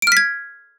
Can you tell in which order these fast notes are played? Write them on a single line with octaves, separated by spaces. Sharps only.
D7 F6 B6 G#6